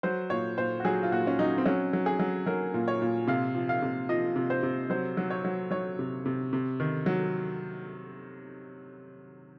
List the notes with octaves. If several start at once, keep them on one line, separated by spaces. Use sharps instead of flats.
F#3 C5
A#2 C#5
A#2 C5
F#4
F#3 G#4
F4
A#2 F#4
C#4
F#3 D#4
C4
F#3 C#4
F#3
G#4
F#3
F#3 A#4
A#2
C#5
A#2
C3 F5
F3
F5
C3
F3 D#5
C3
C5
C3
F#3 C5
F#3
C#5
F#3
F#3 C#5
C3
C3
C3
D#3
F#3